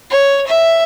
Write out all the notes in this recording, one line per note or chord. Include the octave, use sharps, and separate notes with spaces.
C#5
E5